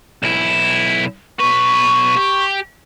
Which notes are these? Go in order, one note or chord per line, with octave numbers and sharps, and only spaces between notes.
B1 E4
B1 B4 C#6
G4